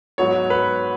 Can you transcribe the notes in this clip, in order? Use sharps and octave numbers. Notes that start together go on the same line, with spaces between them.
G#2 F#3 B3 C#5
B4